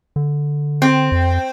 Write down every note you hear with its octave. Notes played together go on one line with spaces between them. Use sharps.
D3
C4
F2